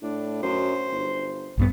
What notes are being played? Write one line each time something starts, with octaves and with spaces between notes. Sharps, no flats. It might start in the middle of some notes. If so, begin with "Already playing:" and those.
A2 D4
F#2 C5
G1
A#1 G2 B3